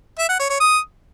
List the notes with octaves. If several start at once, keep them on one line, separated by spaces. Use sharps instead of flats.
E5
F#5
C#5
C#5
D#6